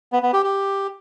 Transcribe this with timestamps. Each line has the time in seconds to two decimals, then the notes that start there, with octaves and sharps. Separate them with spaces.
0.12 B3
0.23 B3
0.33 G4
0.44 G4